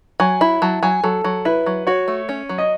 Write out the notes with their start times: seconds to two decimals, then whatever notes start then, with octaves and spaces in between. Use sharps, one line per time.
0.20 F#3 G#5
0.41 E4 B5
0.62 F#3 A5
0.83 F#3 G#5
1.03 F#3 A4
1.24 F#3
1.45 E4 B4
1.66 F#3
1.87 F#4 C#5
2.08 A3
2.29 C#4
2.49 F#3
2.58 D#5